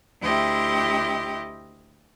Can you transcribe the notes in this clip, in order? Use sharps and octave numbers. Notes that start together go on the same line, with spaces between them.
D2 E4 G4 D#5 G5 C6